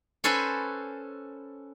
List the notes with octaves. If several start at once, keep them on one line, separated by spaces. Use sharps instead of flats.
C#4 A4 B4 C5 G#5 B5